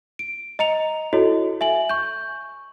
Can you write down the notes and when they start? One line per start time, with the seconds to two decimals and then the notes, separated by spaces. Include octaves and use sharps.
0.19 D7
0.59 D#5 A#5 C#7 F7
1.13 E4 F#4 A4 C#5 D#5
1.61 E5 G#5 F#7
1.89 C#6 G6